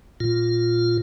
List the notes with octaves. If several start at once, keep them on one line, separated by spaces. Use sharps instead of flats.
A#2 F4